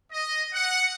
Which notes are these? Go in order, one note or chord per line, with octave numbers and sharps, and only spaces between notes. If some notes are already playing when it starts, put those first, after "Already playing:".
D#5
F#5